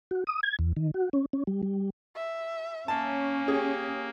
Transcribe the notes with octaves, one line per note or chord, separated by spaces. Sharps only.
F#4
D#6
G#6
E2
D#3
F#4
C#4
C#4
G3
G3
E5
A#3 C#4 A5
G4 G#4